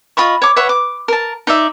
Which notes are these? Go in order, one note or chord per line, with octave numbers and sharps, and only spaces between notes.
F4 D#5 B5 C#6
C#5 D6
B4 C#5 E5 F#5
D6
A#4 A5
D#4 D5 E5